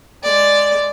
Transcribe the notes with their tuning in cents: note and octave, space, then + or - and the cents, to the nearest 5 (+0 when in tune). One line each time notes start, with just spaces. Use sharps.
G#3 +0 D5 +0